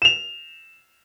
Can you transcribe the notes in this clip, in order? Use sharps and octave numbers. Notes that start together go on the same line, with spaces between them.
E7 F7